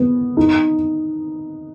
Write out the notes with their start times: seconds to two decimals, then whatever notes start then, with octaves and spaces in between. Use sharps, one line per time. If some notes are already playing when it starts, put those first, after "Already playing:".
Already playing: B3
0.37 D#4